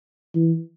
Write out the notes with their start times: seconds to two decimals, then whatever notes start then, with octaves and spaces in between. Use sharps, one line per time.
0.35 E3